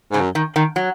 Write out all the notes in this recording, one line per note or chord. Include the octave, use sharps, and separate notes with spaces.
G#2 C#3
F#2
D#3
D#3
F#3